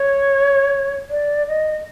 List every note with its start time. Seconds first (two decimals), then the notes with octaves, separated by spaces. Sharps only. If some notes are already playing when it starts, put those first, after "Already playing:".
Already playing: C#5
1.10 D5
1.47 D#5